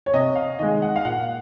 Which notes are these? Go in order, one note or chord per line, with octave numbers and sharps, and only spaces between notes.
C#5
C3 D#5
F5
D#3 G#3 D#5
F#5
F5
A#2 F#5